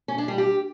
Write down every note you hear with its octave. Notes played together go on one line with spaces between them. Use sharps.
C#4
D4
G3
G4